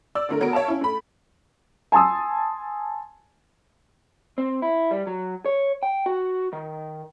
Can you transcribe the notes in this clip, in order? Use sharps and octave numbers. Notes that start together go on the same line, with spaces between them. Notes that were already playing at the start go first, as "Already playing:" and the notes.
D5 E6
D3 A3 A#4
F#3 B3 F#4 A#4 D7
C#5 E5 F5 A5
C#4 E4
A3 B5
G#5 A5 C6 D#6 E6
C4
E4
G3
F#3
C#5
G5
F#4
D#3